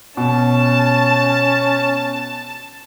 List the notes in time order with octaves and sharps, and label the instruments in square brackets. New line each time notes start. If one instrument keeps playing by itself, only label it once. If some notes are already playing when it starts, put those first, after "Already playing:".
[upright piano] B2 [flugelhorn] C#4 [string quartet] A5